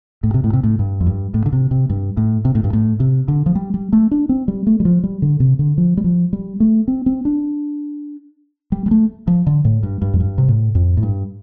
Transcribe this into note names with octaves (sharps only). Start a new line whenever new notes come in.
A2
C3
A2
C3
A2
G2
F2
G2
A2
D3
C3
C3
G2
A2
C3
A2
G2
A2
C3
D3
F3
G3
G3
A3
D4
C4
G3
A3
G3
F3
G3
D3
C3
D3
F3
G3
F3
G3
A3
C4
C4
D4
G3
G3
A3
F3
D3
A2
G2
G2
F2
G2
C3
A2
F2
A2
G2